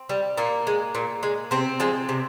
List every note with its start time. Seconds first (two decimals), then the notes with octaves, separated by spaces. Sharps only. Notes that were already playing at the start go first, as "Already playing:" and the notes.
Already playing: C4
0.09 G3
0.37 A#2 A#3
0.67 G#3
0.95 A#2
1.23 G#3
1.51 C3 C4
1.80 F3 G#3
2.09 C3